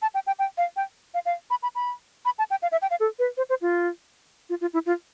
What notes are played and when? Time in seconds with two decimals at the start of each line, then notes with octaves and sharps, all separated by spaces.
0.02 A5
0.14 G5
0.27 G5
0.39 G5
0.58 F5
0.76 G5
1.14 F5
1.26 F5
1.50 B5
1.63 B5
1.75 B5
2.25 B5
2.39 A5
2.51 G5
2.62 F5
2.72 E5
2.82 G5
2.91 F5
3.00 A4
3.19 B4
3.37 C5
3.49 C5
3.62 F4
4.50 F4
4.61 F4
4.74 E4
4.86 F4